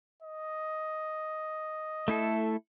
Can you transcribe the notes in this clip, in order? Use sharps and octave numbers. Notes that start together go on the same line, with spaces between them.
D#5
A3 E4 A4